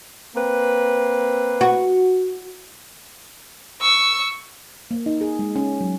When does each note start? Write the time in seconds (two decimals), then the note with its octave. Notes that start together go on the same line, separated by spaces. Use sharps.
0.36 A#3 C4 B4
1.61 F#4
3.81 C#6 E6
4.91 A#3
5.06 D#4
5.21 G#4
5.39 G#3
5.55 C#4
5.81 F#3